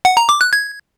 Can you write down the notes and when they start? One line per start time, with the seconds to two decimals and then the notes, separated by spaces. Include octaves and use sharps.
0.05 F#5
0.17 A#5
0.29 D6
0.41 F#6
0.53 G#6